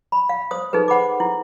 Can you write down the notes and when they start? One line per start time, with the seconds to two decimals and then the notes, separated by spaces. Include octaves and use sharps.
0.12 B5
0.29 F5
0.51 C5 D#6
0.73 D#4 G#4 A4 B4
0.88 C5 F#5 B5 D6
1.20 E4